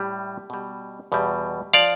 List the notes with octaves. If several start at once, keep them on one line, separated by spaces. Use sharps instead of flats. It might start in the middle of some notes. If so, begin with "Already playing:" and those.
Already playing: A2 G3
B2 G3
E2 B2 G3
F3 D5 F5